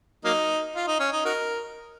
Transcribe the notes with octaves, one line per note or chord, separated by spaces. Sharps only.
F#3 A#3 D#4
F4
D#4
C#4
D#4
D#4 F#4 A#4